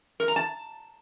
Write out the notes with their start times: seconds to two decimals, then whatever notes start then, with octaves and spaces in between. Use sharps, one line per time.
0.20 A#4
0.28 A#5
0.36 A5